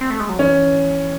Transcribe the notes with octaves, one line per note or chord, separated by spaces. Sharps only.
C4
A3
G#3
F#3
E3 C#4